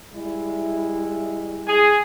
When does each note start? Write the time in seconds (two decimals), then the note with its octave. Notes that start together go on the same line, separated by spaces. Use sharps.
0.14 G3 G#3 E4
1.67 G#4